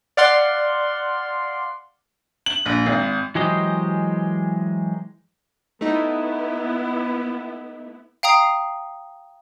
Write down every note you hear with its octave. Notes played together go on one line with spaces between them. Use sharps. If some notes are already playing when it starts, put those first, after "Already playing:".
D5 F5 F#5 C6
F#7
A#1
G#1
E3 F#3 G#3 G4 C5 D#5
A3 B3 D#4 E4
F5 G5 A#5 D#6 C7